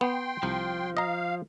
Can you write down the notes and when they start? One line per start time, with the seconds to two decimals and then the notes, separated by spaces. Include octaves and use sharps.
0.01 B3 G5 C6
0.43 C2 F3
0.97 D#5 F5 A#5